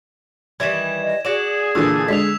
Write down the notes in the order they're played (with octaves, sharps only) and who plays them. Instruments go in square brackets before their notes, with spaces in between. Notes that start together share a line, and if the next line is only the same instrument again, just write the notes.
[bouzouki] D#3 E3 G3 [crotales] G#6 E7
[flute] D#5
[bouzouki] F#4 D5 [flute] G#4 [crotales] E7
[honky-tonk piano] A#2 D3 E3 [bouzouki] F5 A5 [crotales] E6
[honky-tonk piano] D3 G#3 [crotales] B6 F7